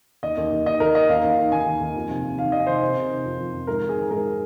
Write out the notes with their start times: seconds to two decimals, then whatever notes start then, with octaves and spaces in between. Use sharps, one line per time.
0.23 D#2 D#5
0.37 D#2
0.52 D#2
0.66 D#3 D#5
0.80 D#2 A#4
0.95 D#3 D#5
1.09 D#2 F5
1.24 D#2
1.30 F5
1.38 D#3
1.52 D#2 G#5
1.66 D#3
1.81 D#2
1.95 F2
2.10 C3
2.24 C3
2.38 D#3 F5
2.52 C3 D#5
2.67 D#3 C5
2.82 C3
2.96 C3
3.10 D#3
3.25 F2
3.39 F2
3.53 F2
3.67 G#2 A#4
3.83 D#3
3.89 G#4
3.97 D#3
4.11 G#2 A#4
4.26 D#3